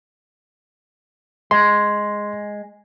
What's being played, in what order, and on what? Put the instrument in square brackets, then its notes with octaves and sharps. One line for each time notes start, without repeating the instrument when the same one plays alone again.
[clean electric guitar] G#3 [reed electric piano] C6